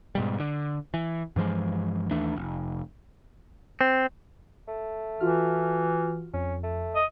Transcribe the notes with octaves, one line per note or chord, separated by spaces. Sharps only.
G#2 B2 G3
D3
E3
G2 E3 F3 G#3
D#2 E3 A3 D4
F1
C4
A3
E3 F4 F#4 F6
F2 C#4
A3
D#5